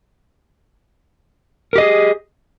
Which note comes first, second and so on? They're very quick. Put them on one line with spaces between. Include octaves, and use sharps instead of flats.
A#4 G4 D#5 G#4